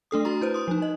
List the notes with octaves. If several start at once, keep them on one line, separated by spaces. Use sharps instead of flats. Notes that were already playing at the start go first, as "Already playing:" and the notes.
A3 D4 A4 D#6
D4 F#4 A#5 C6
E4 B4 C5
C6 D#6
F3 D#4
D#5